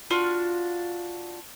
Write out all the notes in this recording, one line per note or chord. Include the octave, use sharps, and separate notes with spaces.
D4 F4 F#4 F6